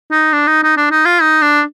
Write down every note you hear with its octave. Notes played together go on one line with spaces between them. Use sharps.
D#4
D4
D#4
D#4
D4
D#4
F4
D#4
D4